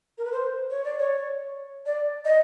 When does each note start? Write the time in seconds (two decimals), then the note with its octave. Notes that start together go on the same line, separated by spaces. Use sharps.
0.18 A#4
0.25 B4
0.32 C5
0.70 C#5
0.84 D5
0.99 C#5
1.86 D5
2.25 D#5